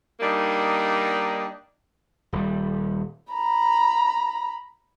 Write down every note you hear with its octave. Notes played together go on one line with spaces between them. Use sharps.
G3 A#3 D4 D#4
D#1 G3
A#5 B5